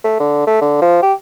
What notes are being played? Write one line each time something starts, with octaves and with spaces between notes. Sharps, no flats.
A3
D3
A3
D3
F3
G4